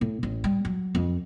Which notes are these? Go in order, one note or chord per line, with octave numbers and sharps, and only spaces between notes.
A2
A1
G3
F#3
F2